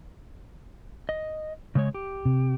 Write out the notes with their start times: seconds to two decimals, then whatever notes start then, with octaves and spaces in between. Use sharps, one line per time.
1.09 D#5
1.75 C#3 G#3 C#5
1.94 G4
2.25 C3